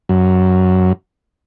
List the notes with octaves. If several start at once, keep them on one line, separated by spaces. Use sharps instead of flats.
F#2